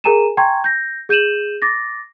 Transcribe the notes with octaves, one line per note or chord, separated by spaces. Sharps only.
G#4 A#4 G#5 A#5 D#7 E7
G5 G#5 A#5 C6 C#6 G#6
G6 A#6
G#4 G6 D#7 E7 F#7
D6 A6 A#6